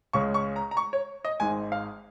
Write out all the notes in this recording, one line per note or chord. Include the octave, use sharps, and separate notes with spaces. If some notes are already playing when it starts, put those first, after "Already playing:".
C#2 C#3 G#3 C#6
C#6
A#5
A#5
C#6
C#5
D#5
G#1 G#2 G#3 G#5
F5